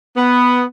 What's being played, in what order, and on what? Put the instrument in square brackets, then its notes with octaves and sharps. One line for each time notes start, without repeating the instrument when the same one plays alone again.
[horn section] B3